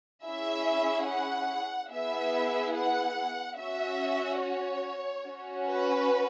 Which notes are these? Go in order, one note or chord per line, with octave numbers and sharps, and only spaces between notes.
C#4 E4 G#4 E5
F#5
B3 E4 G#4 E5
F#5
C#4 F#4 E5
C#5
C#4 F#4
B4